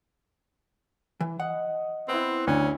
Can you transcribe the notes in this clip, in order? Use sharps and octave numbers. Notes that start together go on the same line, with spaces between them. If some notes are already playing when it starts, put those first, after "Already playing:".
E3
D#5 F#5
B3 C4 E4
D2 C#4